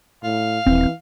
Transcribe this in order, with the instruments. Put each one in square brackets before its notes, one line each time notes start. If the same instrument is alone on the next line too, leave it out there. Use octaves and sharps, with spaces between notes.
[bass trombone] A2 [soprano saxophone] F5
[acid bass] D#1 [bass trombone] E3 [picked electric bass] C4